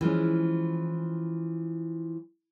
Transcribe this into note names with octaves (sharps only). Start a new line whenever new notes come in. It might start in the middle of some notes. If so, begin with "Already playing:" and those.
E3 F3 G#3 C#4